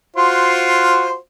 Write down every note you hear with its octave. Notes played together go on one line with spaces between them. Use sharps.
F4 F#4 C5